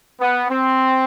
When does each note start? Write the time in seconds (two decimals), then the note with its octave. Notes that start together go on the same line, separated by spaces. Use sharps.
0.21 B3
0.49 C4